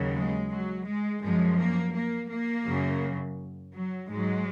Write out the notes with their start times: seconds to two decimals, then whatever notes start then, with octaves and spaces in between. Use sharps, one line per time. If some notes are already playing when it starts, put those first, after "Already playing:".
Already playing: D#2 C#3 F#3
0.15 G#3
0.50 F#3
0.86 G#3
1.22 F#2 F3 G#3
1.58 A#3
1.94 A#3
2.30 A#3
2.66 F#2 C#3 F#3
3.74 F#3
4.08 G#2 F#3 G#3